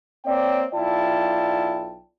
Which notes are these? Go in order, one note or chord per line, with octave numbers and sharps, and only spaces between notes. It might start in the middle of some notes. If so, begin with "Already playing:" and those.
A#3 C4 C#5 D5 G5
B1 E4 F4 D5 G5 A5